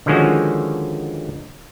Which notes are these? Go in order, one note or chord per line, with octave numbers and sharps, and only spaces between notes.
D3 D#3 F3 G#3 C#4 F#4